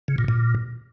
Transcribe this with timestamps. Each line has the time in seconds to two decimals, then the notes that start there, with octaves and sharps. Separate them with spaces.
0.08 C#3
0.18 A#2
0.28 A#2